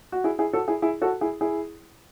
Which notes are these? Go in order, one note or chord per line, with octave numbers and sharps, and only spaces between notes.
F#4
E4 G#4
E4 G#4
F#4 A4
E4 G#4
E4 G#4
F#4 A4
E4 G#4
E4 G#4